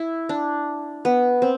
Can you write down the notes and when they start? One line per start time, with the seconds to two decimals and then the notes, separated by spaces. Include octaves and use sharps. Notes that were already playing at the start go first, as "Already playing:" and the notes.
Already playing: E4
0.29 D4
1.05 B3
1.42 C4